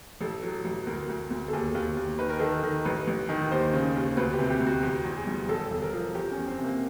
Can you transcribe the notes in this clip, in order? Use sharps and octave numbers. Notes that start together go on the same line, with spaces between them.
A1 A4
F#3
A1
D2 A#4
D2
D2
A4
D#2 G#4
D#2
D#2
D#3 B4
A#4
D#3 A4
A#4
D#3
A1 B4
A1
D#3
D#2 C5
C#3
D#2
D2 B4
G4
C3
G4
D2
F#4
E2 G4
E2
G#4
G3
E1 A4
E1
A#4
F3
E2 G4
C#4
E2
C4
C3
A#3